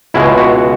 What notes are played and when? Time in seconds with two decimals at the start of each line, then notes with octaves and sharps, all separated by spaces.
0.14 C#2 B2 G#3 E4
0.38 F#4